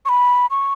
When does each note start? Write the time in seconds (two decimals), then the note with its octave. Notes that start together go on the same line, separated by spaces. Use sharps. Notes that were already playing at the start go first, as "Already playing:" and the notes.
0.05 C#6
0.09 B5
0.51 C#6